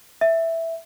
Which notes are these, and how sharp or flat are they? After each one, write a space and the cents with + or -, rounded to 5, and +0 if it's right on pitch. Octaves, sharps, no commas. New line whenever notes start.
E5 +0